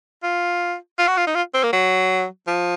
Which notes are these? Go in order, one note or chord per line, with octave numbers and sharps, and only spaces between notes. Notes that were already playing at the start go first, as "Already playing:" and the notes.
F4
F4
F#4
F4
D#4
F4
C4
A#3
F#3
F3